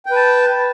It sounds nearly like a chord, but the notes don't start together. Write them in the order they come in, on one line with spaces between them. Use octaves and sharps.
G5 B4 A5